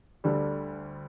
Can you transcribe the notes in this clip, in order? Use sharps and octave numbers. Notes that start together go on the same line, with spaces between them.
D2 D3 G3 D4 A4